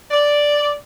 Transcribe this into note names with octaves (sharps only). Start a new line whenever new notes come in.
D5